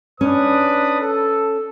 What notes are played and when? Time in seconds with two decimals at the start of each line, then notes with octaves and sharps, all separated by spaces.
0.21 C#4 D4 B4 D#6
1.01 A4